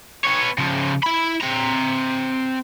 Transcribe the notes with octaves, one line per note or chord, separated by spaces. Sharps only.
B3 C#5
C#3 F3
E4 B5
C4 A#5